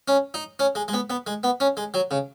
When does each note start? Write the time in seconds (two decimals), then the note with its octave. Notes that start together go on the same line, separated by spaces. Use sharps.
0.08 C#4
0.34 D#4
0.59 C#4
0.75 G#3
0.88 G#3
0.93 B3
1.10 B3
1.27 G#3
1.43 B3
1.60 C#4
1.77 G#3
1.94 F#3
2.11 C#3